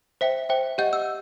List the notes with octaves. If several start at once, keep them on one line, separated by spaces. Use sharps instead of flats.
C5 E5 G5 B6
C5 E5 G5
G4 D#5 F#5 G6
E6